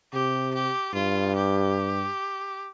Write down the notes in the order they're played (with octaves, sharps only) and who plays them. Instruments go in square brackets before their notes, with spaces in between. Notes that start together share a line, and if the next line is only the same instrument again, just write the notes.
[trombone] C3 [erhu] G4
[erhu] G4
[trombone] G2 [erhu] F4
[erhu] G4